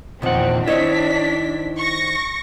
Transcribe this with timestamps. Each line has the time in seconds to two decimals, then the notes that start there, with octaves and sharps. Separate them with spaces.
0.22 E2 A#2 D#3 F3 C4 F#5
0.68 D#3 C4 D4 E4 C5 C#5 D#5 B6
1.78 C#6 A#6